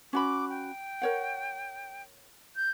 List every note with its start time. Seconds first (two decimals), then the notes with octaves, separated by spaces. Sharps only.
0.13 C#4 F#4 B5 D6
0.49 G5
1.02 A#4 C#5 F#5
2.56 G6